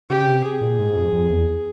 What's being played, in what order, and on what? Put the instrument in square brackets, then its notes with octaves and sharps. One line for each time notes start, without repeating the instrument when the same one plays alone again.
[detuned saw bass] C#3 [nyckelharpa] G4
[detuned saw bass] C3
[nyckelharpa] G#4
[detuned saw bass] A#2
G#2
F2
F2
E2